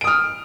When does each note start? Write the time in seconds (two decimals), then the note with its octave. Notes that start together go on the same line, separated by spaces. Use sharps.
0.01 D7
0.04 D#6
0.07 F6